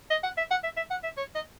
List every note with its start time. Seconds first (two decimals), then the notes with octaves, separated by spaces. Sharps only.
0.10 D#5
0.24 F#5
0.37 E5
0.51 F#5
0.64 E5
0.77 E5
0.91 F#5
1.03 E5
1.17 C#5
1.35 D#5